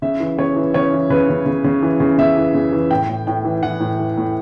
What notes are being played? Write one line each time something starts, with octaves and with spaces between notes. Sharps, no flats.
C#3 E5
E3
C#3 C#5
E3
C#3 C#5
E3
C#3 B4
C#3
C#3
C#3
E3
C#3
C#3 E5
E3
C#3
E3
A2 G5
A2
A2 G5
E3
E3 F#5
A2
E3
A2